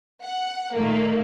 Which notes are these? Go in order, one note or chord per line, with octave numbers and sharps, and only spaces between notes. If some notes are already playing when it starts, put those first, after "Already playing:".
F#5
A#2 D#3 A3 A#3